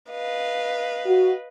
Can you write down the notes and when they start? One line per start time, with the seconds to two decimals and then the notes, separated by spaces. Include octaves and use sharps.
0.12 B4 D#5 F5
1.06 F#4